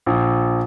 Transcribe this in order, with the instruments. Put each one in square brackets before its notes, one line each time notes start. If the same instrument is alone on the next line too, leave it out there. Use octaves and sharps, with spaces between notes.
[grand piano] A#1